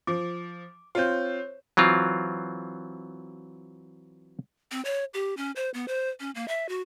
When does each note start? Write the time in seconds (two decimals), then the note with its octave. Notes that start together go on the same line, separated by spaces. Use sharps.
0.07 F3 D6
0.95 C4 F4 C5 C#5 G6
1.77 E3 F#3 C4 F4
4.72 C4
4.85 C#5
5.14 G4
5.37 C#4
5.56 C5
5.74 B3
5.88 C5
6.20 C#4
6.35 A#3
6.48 E5
6.69 F#4